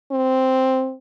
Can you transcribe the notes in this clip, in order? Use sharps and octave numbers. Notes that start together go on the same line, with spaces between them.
C4